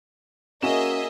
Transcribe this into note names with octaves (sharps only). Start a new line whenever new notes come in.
A#3 C#4 F#4 G#4 D#5 E5 E7